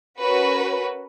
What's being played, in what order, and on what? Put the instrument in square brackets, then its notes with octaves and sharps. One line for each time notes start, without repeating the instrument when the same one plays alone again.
[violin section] C#4 F#4 A#4 B4